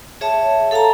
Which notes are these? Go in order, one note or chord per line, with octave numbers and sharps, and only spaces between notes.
G#4 C#5 E5 A5
A4 F5 G5 A5 A#5